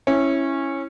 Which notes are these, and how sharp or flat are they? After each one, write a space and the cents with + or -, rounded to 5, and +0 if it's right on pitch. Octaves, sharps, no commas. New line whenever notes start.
C#4 -15 E4 +0